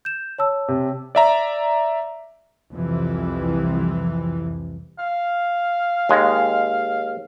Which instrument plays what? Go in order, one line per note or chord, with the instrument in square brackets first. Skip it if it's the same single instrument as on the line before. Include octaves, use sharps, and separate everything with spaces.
[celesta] G6 E7
C#5 A5 E6
[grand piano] C3
[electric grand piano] D5 E5 A#5
[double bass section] C2 F2 C3 E3
[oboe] F5
[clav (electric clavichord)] D#2 G#3